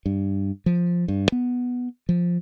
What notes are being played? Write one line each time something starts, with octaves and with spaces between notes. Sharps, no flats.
G2
F3
G2
B3
F3